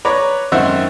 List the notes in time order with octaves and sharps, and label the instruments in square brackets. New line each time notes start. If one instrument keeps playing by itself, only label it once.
[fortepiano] B4 C#5 D5 A#5
G#1 F#2 D#3 C5 E5 F#5